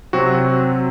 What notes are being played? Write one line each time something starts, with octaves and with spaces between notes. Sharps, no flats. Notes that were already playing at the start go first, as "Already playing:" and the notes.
C3 F#3 C4 F#4